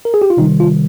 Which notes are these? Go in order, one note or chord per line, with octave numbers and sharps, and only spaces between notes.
A#4
G#4
G4
F4
C3 D#3 G3 D#4
F4